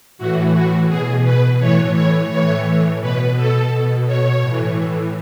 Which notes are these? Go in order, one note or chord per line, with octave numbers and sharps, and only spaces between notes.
A2 E3 F#4
F#4
B2 G#4
B4
A2 E3 C#5
C#5
A2 E3 C#5
B2 B4
A4
B2
C#5
A2 E3